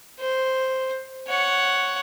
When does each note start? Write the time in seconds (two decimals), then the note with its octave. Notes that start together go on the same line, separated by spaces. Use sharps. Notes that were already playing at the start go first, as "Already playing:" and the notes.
0.20 C5
1.28 C#5 F#5